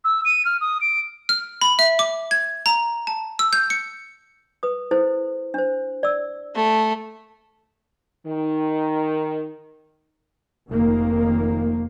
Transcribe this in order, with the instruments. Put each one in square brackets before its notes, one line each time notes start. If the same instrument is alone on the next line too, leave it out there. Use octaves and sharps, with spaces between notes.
[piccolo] E6
D#7
F6
D#6
D7
[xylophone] F6
B5
E5
D6
G#6
A#5
A5
E6
G6
C#7
[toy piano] B4 D#6
E4 A4 C5
D4 C5
D5 E6
[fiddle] A3
[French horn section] D#3
[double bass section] F1 D#3 A#3